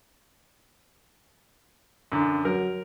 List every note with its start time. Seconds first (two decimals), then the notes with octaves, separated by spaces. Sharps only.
2.12 F#2 D3
2.45 F#3 A#4